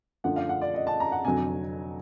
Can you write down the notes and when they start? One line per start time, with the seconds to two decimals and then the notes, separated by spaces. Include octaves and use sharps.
0.24 F#2 D3 F3 A3 D4 F#5
0.36 F5
0.49 F#5
0.62 D5
0.74 D#5
0.87 A5
1.00 A#5
1.12 F#5
1.24 F1 F2 D3 F#3 G#5